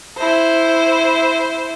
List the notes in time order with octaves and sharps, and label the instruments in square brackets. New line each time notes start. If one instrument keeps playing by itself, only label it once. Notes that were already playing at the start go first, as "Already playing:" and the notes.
[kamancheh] E4 C5